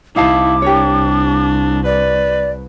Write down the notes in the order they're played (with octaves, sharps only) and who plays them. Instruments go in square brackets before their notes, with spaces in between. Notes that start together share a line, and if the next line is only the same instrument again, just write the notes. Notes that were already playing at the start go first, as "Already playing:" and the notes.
[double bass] C2 [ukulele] D#4 F5 A5 [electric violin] E4 [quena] D6
[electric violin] D4 [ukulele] G4 A#4 C#5
[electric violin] B4 [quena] D5